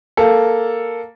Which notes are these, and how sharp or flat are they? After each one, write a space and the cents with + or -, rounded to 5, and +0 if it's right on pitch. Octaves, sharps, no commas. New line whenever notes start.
A#3 +0 A4 +0